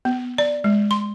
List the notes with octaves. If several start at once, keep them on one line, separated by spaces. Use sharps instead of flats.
B3
D5
G#3
C6